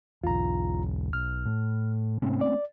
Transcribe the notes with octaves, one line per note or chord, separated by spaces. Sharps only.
B1 E2 F4 A#5
B1 F6
A2
G#2 C3 A3 C4 C#4
D5